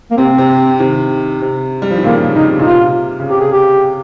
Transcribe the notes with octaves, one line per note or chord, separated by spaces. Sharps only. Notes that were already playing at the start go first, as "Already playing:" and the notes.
A#3
C3 C4
C3
C3 D#3
C3
G3
F3
D#3
A#2 C#3 A#3
C#3 D#4
C3
A#2 D#4
C3 F4
C#3
C3 G4
G#4
G4